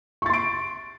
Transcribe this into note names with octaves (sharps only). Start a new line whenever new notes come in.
C6 C#6 A6 D7